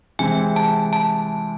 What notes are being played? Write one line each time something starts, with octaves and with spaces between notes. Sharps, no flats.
C3 E3 G#3 C4 G#5
A5
A5